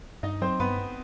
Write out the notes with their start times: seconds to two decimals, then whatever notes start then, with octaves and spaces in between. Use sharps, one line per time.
0.23 G2 D#4 D#5
0.41 F#3 C4 C5
0.59 G2 B3 B4
0.78 B3